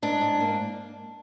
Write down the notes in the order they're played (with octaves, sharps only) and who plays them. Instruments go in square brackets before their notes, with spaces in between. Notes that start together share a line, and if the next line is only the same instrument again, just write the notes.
[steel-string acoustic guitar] G#2 D4
G#2
A#3